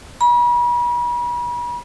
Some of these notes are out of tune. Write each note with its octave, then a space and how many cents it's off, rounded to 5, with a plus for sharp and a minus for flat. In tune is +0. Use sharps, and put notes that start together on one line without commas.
B5 -40